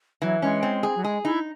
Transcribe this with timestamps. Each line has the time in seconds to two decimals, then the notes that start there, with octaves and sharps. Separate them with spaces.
0.22 E3 F#3
0.42 G#3 C#4
0.63 C4
0.83 G#4
0.95 F#3
1.04 G#3 G#4
1.25 D#4 E4